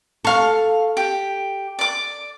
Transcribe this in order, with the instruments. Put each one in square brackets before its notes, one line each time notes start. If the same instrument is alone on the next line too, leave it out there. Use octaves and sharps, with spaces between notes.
[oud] A4 [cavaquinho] F5 C#6
[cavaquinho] G4
D5 D6